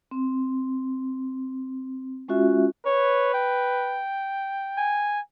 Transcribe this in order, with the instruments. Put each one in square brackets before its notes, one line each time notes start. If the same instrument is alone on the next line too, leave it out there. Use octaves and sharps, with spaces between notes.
[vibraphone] C4
G#3 C#4 F4 F#4 E5
[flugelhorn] B4 [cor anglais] C#5
[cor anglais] G5
[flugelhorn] G#5